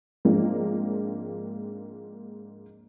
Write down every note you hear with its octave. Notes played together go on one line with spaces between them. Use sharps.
G#2 F3 A#3 C4 D4